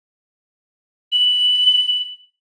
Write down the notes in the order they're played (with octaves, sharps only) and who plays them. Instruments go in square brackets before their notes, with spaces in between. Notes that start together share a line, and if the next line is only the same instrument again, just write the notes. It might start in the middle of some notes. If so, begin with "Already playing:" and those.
[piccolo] F#7